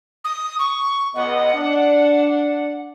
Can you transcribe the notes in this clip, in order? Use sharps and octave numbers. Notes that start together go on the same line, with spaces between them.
D#6
C#6
C#2 B3 D#5 F#5
D4